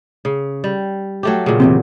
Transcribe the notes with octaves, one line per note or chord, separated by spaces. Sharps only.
C#3
G3
F#3 A3 G4
A#2 C#3
E2 G2 C3